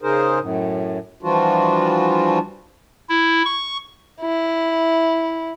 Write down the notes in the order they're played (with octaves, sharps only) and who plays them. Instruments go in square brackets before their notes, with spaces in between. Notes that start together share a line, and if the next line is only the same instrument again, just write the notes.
[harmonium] C#3 D#4 G#4 A#4 C5
F#2 A2
E3 F3 G3 D4 F4 F#4
[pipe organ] E4
C#6
[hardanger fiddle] E4